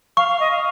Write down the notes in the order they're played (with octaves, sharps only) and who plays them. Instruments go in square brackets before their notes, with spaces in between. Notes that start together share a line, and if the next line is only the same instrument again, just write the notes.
[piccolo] F5 [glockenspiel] C#6
[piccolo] F5
D#5
F5